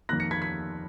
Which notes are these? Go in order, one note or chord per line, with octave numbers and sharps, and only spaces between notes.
F2 D#3 A#3 F#6 A#6
A#6 C#7
G#6 B6
G#6 B6